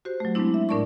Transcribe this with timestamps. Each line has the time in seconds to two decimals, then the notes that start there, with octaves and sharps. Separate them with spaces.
0.05 F#4 G4 C5
0.20 F#3 A3
0.35 G#3 A3 B3 C4 D4 E4
0.54 E5
0.69 A2 D4 A#4 D5 A5 C#6